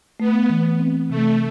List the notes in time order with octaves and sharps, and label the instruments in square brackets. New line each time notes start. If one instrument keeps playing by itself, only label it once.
[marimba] A3 [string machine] B3
[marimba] E3
C4
[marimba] C3 [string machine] A3